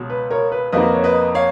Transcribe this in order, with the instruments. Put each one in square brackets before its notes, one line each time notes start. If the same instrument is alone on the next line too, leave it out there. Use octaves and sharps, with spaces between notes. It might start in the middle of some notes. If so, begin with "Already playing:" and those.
Already playing: [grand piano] C#2 B2 F#3
[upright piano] B4
A#4 C#5
B4
[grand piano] F2 F3 A#3 D#4 F#4 [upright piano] B4 D#5
[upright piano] C#5
B4 D#5
C#5 F5